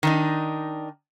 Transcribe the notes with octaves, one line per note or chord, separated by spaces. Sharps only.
D#3 D4 D#4